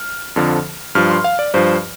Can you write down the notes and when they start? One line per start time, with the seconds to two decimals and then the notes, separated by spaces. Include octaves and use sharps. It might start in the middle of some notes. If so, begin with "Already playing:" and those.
Already playing: F6
0.36 F2 D3 F3
0.95 G2 F3 F6
1.10 C6
1.24 F5
1.39 D5
1.54 G2 F3 C5